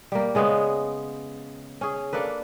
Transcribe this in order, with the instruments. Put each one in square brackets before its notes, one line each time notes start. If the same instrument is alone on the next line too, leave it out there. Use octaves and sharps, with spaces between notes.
[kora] G3 A#3
C#3 G#3 B3 C#5
C#4 G#4
A#3 D4 A4 B4